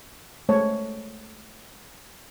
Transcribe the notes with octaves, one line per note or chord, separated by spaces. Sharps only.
G#3 A3 C5 C#5 A5